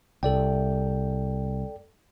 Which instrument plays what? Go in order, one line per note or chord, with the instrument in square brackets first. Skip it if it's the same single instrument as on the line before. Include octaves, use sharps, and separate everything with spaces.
[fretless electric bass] C2 [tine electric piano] A4 D5 G5